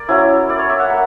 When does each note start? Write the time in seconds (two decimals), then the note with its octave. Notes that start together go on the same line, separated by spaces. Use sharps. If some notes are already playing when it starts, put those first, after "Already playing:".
Already playing: A#3 D5
0.09 F#3 C#4 E4
0.49 D5
0.59 C#5
0.69 E5
0.79 F#5
0.90 A#3 F#5